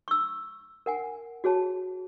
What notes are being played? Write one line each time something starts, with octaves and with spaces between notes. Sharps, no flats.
C#6 E6
A#4 F#5 G#5
F#4 G#4 C#5 A5